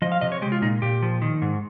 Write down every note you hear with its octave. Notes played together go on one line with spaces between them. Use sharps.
F3 D#5
F5
C3 D#5
C#5
G#3 G4
F4
A#2 D#4
A#2 G4
F3
D#3
G#2